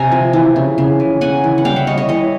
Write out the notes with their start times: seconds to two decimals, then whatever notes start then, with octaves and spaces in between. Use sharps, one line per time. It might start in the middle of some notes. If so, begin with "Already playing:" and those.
Already playing: C3 G#5 A#5
0.12 F3
0.33 E3
0.56 C#3
0.78 C#3
1.00 E3
1.21 C#3 F#5 G#5
1.44 E3
1.58 F#5
1.65 G3 F5 G5
1.76 E5 F#5
1.87 G3 C#5 D#5
1.98 C#5 D#5
2.09 E3 C#5 D#5